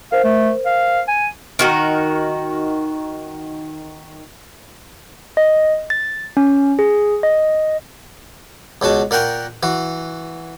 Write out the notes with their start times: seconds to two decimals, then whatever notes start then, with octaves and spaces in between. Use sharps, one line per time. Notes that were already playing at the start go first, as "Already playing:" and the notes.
0.12 A#4 C5 F5
0.24 A3
0.65 F5
1.08 G#5
1.59 D#3 F#4 A#4
5.37 D#5
5.90 A6
6.37 C#4
6.79 G#4
7.23 D#5
8.82 C#2 B2 F#4 A5
9.11 A#2 A#4 F#5 G5 A#5 C#6
9.63 E3 F#4